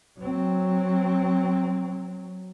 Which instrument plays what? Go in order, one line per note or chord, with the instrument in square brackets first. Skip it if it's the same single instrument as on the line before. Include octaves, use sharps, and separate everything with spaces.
[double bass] F#3 C4